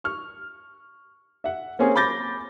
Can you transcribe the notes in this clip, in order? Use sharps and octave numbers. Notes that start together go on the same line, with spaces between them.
C#6 F6
E5 F#5
A#3 C4 C#4 G#4
B5 D6 G6 A6 A#6